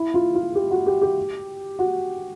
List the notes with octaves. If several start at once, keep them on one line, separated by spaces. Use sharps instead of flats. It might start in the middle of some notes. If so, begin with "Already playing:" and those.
Already playing: E4
F4
F4
G4
F#4
G4
G4
F#4